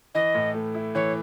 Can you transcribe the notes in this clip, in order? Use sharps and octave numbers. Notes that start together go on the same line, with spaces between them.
E3 D#5
A2
A3
E4
E3 C#5